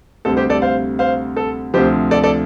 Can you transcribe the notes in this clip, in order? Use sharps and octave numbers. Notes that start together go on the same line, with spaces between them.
D2 C3 G3 C4 A4
G4 C5
A4 D5
C5 F5
C5 F5
A4
D2 C3 F3 G4 C5
A4 D5
A4 D5